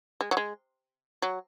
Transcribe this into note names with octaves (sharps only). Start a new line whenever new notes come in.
G#3
F#3
G#3
F#3